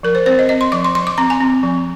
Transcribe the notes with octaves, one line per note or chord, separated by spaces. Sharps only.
F3 A#4
C5
C4 C5
D#5
C4 D#5
C6
F3 D6
C6
F3 C6
D6
C4 A#5
G#5
C4
F3